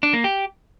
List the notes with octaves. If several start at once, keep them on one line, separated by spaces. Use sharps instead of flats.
D4
A#3
G4